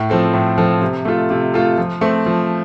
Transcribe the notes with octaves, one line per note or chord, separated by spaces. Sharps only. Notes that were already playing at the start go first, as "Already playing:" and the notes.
Already playing: A2
F3 C4 A4
A2
F3 C4 A4
C3
A3 F4 A4
C3
A3 F4 A4
F3
A3 C4
F3